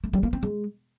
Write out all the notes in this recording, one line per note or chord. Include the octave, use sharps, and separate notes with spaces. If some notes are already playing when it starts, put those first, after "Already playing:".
A3
G3
A#3
C4
G#3